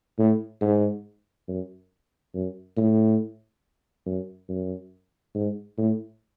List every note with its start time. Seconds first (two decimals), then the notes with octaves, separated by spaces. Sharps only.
0.19 A2
0.61 G#2
1.48 F#2
2.34 F#2
2.77 A2
4.06 F#2
4.49 F#2
5.35 G#2
5.78 A2